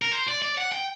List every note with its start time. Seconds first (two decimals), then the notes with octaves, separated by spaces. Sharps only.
0.02 A#4
0.11 C5
0.28 D5
0.42 D5
0.57 F#5
0.72 G5